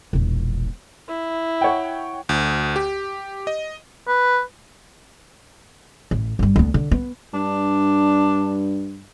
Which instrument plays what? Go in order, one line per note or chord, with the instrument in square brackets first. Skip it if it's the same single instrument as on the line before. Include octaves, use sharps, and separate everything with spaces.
[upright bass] E1 A#1
[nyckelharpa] E4
[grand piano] C#5 F#5 G5
[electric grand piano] D2
G4
D#5
[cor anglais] B4
[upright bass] A1
G1 G3
D2 B3
D3
B3
[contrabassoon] G2 [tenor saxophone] D4